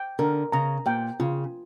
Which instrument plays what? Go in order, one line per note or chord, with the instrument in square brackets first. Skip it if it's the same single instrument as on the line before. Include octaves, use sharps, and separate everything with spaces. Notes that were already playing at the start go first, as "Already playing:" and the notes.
Already playing: [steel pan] G5
[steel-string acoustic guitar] D3 [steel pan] A#4
[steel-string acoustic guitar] C#3 [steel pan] A#5
[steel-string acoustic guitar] A#2 [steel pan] G5
[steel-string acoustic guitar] C#3 [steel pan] F4